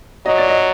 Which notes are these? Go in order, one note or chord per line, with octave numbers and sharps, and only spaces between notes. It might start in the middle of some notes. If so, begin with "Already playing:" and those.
F#3 D#5
D5
D#5